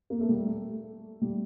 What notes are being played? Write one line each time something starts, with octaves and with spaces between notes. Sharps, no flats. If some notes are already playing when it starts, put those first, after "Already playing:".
A#3
A3
G3
A3
G3